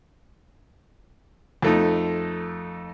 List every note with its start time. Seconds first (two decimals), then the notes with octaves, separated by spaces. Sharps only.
1.62 F2 A3 D#4